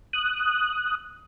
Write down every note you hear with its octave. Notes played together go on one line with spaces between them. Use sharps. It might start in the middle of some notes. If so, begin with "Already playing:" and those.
D#6 F#6